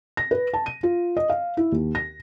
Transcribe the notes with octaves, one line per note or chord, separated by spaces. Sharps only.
A#6
B4
A5
D#7
F4
D#5
F5
E4
D#2
A#6